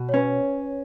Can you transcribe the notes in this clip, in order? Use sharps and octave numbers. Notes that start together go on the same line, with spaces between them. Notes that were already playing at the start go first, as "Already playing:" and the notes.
Already playing: B2
C#5
C#4 B4